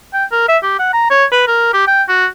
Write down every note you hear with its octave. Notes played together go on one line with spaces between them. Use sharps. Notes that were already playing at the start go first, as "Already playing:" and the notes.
G5
A#4
E5
G4
F#5
A#5
C#5
B4
A#4
G4
G5
F#4